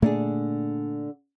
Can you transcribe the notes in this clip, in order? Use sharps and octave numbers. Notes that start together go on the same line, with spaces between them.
A#2 D3 A3 A#3 D4 G#4